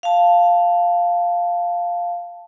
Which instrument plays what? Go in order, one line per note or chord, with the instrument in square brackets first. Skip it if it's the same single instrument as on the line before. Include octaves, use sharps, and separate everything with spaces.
[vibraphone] F5 A5